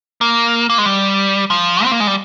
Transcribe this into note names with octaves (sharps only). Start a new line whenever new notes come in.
A#3
A#3
G#3
G3
F3
C4
A#3
G#3
G3